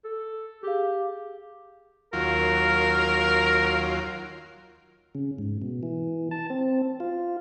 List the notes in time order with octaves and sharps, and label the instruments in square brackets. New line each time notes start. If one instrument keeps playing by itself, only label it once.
[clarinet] A4
[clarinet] G4 [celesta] G#4 F5
[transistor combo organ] D#2 F#3 F4 [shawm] A#4
[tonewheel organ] C#3
G#2
B2
E3
A5
C4
F4